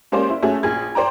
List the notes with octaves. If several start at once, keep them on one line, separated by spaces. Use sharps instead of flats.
G#3 A#3 C#4 G4 C5 D5
E4
A3 C#4 F#4 G#4 E5
A#1 G#4 G#6
C5 D5 G5 A#5